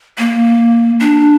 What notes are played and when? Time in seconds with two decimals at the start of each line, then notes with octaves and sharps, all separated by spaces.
0.18 A#3
1.00 D4